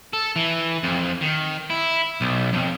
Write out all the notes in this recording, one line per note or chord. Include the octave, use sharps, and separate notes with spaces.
A4
E3
F2
D#3
E4
B1
F2